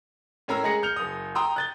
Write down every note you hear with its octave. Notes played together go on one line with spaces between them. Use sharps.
A2 C#4 A#4 A#5 E6
G#3 G#4 A#5 A#6 C#7
F6 G6 C#7 F7
F#1 D#6
G5 A#5 C6 D#6 E6
F#6 A6 G7